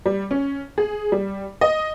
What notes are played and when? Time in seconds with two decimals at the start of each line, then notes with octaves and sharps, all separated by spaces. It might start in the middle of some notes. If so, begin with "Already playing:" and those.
0.06 G3
0.31 C#4
0.78 G#4
1.12 G3
1.61 D#5